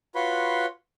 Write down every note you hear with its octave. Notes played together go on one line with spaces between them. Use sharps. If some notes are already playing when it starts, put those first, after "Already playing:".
F4 F#4 B4 C#5 B5 C6